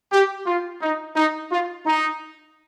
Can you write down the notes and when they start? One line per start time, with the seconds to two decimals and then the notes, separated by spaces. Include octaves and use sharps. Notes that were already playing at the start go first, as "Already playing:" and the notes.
0.12 G4
0.47 F4
0.82 D#4
1.16 D#4
1.52 F4
1.86 D#4